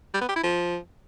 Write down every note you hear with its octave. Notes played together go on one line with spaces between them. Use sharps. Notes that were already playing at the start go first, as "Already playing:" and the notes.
G3
B3
G4
E4
F3